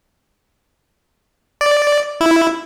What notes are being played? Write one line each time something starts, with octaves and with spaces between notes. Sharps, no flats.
D5
E4